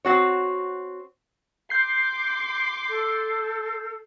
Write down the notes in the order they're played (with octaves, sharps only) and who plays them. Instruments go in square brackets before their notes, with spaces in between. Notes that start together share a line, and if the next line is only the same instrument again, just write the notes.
[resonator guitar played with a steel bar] C4 F#4 C#5
[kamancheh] C6 D6 [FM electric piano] G6 C7
[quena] A4